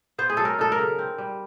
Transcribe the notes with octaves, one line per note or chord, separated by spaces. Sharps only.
B3 C5
G#4
F#3 A4
A#4
D#4 A4
A#4
C#3
C4
G3